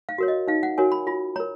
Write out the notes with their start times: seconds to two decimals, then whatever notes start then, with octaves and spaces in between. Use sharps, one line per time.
0.09 F5
0.18 F#4 A#4 C#5
0.28 D#5
0.47 D#4 F5
0.63 F#5
0.78 F#4 A#4 C#5 G#5
0.92 B5
1.07 F4 B5
1.36 A#4 C#5 A#5